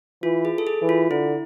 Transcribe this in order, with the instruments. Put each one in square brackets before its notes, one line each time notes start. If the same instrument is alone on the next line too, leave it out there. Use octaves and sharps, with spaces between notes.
[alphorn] E3 [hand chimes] F4
[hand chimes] G#4
A4
G#4
[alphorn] E3
[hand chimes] F4
[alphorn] D3 [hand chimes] E4